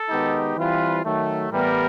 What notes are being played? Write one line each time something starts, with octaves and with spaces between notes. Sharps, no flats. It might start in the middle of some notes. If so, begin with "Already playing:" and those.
Already playing: A4
D#3 G#3 B3 D#4 G4
E3 G3 C4 F4 B4
D#3 F#3 A3
A2 E3 G3 B3 A#4